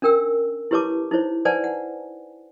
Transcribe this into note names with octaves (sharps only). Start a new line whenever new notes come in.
C#4 D4 A#4 G5 E6
E4 G4 B4 C#5 A5 D6
D#4 E4 C5 C#5
B4 C5 D5 F#5 G#5 A5
F#5